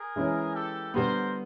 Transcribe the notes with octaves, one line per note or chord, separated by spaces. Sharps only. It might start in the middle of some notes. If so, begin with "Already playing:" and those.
Already playing: G#4 A#4
E3 G#3 C#4 E4
G4 A4
D3 G3 B3 A#4 C5